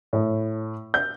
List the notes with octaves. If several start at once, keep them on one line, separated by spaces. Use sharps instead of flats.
A2
G6